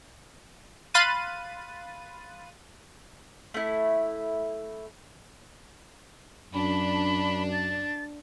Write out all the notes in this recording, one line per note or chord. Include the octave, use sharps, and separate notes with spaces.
F5 B5 C6 F#6 A6 D#7
A3 E4
F#2 D4 B5
A6